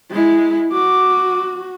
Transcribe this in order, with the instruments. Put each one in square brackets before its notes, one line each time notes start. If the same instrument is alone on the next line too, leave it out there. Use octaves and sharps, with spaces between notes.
[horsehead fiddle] G#3 E4
[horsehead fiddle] F#4 [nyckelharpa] D6